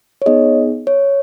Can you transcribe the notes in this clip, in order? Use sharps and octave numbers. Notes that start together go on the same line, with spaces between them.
C#5
B3 D#4 G#4 D#5
C#5